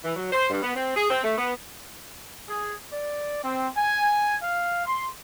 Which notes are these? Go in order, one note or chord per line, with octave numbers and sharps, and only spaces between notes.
E3
F#3
C5
G2
B3
C4
G#4
C4
A3
B3
G#4
D5
C4
G#5
F5
C6